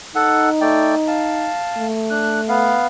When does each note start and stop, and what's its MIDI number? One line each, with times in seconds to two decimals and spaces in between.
0.16 1.52 63
0.16 0.49 69
0.16 0.49 78
0.61 0.95 57
0.61 0.95 74
0.61 0.95 79
1.08 1.87 77
1.08 1.87 81
1.77 2.81 57
2.10 2.41 62
2.10 2.41 90
2.48 2.87 59
2.48 2.87 77